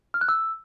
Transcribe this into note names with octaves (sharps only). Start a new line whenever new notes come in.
F6
F#6
E6